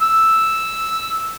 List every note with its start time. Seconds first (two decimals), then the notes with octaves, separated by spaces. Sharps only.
0.02 E6